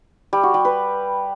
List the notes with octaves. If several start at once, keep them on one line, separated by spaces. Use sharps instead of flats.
G3
F#4
G3
B4